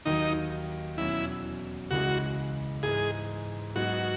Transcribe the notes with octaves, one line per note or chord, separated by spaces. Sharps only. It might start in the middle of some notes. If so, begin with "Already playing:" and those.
D#2 D#3 F#3 D#4
E2 B2 F#3 C#4 E4
C#2 C#3 E3 G#3 F#4
G#2 E3 G#3 G#4
G#2 F#3 B3 D#4 F#4